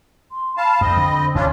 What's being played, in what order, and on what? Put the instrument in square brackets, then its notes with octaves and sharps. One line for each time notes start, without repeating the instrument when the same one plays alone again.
[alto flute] C6
[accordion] F5 A5 [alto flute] B5
[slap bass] F2 [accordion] C4 D#5
[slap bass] D3
[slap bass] D2 A#2 [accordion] C#4 D4 F4 [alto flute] C#5